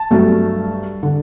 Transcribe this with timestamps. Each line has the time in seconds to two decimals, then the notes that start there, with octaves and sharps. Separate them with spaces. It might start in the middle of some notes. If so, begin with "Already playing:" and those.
Already playing: A5
0.11 G2 F#3 A3
1.03 D3